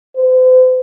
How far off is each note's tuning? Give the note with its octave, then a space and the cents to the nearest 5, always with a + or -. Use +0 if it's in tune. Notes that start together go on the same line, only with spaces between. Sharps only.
C5 -40